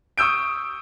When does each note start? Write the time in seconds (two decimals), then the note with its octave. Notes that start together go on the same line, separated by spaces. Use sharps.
0.18 C#6 D#6 E6 G6 D7